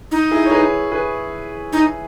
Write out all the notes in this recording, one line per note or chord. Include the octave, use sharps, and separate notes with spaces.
D#4
E4 G#4
C#5
G#4 B4
G#4 B4
D#4